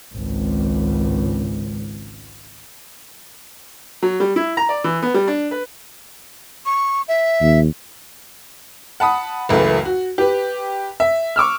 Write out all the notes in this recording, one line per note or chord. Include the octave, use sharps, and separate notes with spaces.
G#1 C#2
F#3
G3
E4
A#5
D5
E3
B3
G3
D4
B4
C#6
E5
D#2
F#5 A5 B5 D#6
F#1 C#2 E3 A3 B5
F#4
G4 B4
E5
C#6 D6 E6 F6